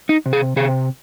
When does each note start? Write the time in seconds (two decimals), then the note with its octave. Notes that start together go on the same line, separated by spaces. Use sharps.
0.09 D#4
0.26 C3
0.33 G#4
0.56 C3 G#4